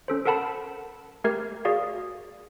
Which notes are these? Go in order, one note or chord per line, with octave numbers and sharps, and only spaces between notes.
C#4 A4 C5
A4 A#4 F#5 A5 B5
A3 G4 A#4 F6 G#6
F#4 G#4 D5 F5